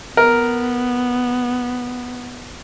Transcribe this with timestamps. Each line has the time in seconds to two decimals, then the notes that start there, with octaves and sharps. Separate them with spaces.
0.17 B3 A#4